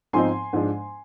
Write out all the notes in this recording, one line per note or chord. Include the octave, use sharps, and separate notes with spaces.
G#2 F3 C4 D#4 G#5 C6
G#2 F3 G#3 D4